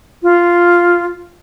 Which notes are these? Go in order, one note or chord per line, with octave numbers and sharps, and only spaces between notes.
F4